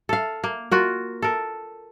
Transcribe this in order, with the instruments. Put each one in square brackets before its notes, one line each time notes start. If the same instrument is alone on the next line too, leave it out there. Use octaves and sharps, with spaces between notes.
[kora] A4 F5
A#3
F4 F#4 A#4
A4 A#4